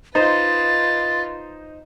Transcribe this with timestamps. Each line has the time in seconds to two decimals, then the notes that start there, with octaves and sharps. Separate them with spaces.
0.15 D#4 F4 B4 C5 A6